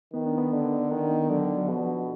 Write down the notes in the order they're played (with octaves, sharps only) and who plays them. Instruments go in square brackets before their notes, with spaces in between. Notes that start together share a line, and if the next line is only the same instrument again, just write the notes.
[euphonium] D#3 [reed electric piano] B3
[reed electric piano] D4
B3
[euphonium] D3
[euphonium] D#3 [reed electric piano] D4
[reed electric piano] B3
[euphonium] D3 [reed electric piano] F#3
[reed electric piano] F#3
[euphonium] B2 [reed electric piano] F3